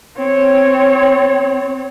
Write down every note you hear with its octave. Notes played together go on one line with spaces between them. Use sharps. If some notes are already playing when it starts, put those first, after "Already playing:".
C4 C#5